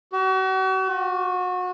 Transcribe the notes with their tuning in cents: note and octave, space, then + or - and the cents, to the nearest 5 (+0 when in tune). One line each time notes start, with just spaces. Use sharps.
F#4 +40
F#4 -30